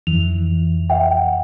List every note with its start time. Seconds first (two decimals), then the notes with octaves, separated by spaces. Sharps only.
0.07 F2 E3 F7
0.90 E5 F#5 G5